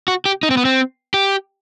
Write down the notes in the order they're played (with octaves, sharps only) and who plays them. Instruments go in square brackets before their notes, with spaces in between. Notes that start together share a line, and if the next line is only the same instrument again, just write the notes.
[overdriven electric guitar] F#4
G4
D#4
C4
B3
C4
G4